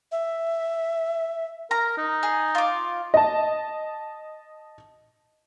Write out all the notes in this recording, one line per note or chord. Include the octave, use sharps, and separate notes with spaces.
E5
A#4 A#5
D#4
G#4
F4 D6
D#5 A5